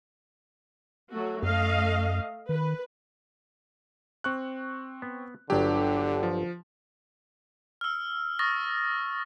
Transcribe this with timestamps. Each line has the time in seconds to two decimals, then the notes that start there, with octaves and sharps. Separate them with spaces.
1.12 F#3 A3 F#4
1.43 F#2 A3 D#5 F5
2.49 D#3 B4
4.24 C4 C#6 F#6
5.02 B3
5.50 G1 D3 F#3 D4 G4
6.23 F3
7.81 E6 F6
8.39 C#6 D#6 F6 A6 A#6